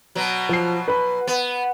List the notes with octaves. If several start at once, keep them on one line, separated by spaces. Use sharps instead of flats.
B2 F#3
F3 C7
B4 B5
B3